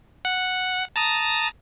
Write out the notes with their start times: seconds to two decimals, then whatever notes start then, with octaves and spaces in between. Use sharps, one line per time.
0.25 F#5
0.96 A5 A#5 D#6